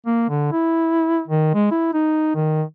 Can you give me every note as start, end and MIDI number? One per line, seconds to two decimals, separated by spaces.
0.06 0.27 58
0.29 0.51 50
0.52 1.22 64
1.28 1.50 51
1.54 1.66 56
1.71 1.91 64
1.93 2.33 63
2.35 2.63 51